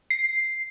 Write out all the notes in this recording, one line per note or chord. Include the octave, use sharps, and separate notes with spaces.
C7